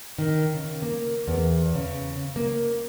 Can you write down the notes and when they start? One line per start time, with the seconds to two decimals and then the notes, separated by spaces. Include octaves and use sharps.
0.18 D#3
0.54 C#3
0.82 A#3
1.28 E2
1.75 C#3
2.36 A#3